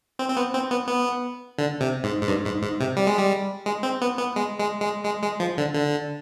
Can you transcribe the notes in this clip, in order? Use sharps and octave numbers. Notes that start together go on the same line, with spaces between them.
C4
C4
B3
C4
B3
B3
D3
C3
G#2
G#2
G2
G#2
G#2
C3
G3
G#3
G3
G#3
C4
B3
B3
G#3
G#3
G#3
G#3
G#3
F3
D3
D3